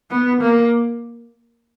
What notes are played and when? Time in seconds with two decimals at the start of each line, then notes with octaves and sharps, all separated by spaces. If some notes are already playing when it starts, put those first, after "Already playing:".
0.11 B3
0.41 A#3